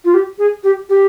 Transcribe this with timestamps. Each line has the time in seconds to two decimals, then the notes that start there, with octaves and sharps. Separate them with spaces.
0.05 F4
0.14 G4
0.39 G#4
0.64 G4
0.89 G4